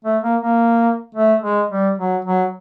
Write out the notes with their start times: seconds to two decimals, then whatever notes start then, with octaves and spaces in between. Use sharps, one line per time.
0.05 A3
0.23 A#3
0.41 A#3
1.15 A3
1.42 G#3
1.70 G3
1.98 F#3
2.25 F#3